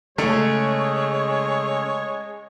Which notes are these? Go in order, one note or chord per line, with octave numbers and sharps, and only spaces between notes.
C#3 G#3 A3 C#5